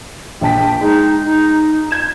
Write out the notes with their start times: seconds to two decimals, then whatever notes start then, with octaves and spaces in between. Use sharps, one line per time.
0.41 A#1 G5 A5 B6
0.81 G#3 D#4
1.24 D#4
1.91 G6 G#6 E7